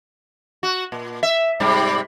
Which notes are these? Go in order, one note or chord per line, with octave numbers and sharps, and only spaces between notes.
F#4
A#2
E5
G#2 C3 G3